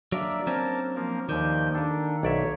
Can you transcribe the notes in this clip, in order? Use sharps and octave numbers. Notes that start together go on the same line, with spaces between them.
F#3 A#3 D4 A#4 D5 E5
F#3 C4 C#4 A#4 A5
F3 A#3 A#4
D#2 D#3 F3 D5 G6
A#3 D4 G4 A4
B1 C#5 D5 E5